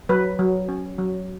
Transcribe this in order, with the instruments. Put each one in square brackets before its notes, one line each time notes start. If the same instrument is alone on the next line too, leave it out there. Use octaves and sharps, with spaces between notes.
[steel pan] F#3 B4
F#3
C#4
F#3